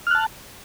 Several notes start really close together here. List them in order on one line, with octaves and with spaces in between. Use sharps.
F6 F#6 A5